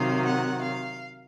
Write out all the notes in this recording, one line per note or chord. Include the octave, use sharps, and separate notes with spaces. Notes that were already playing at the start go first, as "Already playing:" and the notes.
Already playing: C3 D#3 F#3 F5
F#5
F5